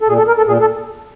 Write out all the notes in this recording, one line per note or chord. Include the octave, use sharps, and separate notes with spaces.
A4
A#2 G#4
A4
A#4
A4
A#2 G#4
A4